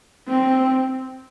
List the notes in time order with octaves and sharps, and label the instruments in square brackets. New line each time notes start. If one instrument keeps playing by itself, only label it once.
[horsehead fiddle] C4